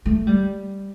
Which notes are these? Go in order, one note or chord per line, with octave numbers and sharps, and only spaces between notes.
A3
G3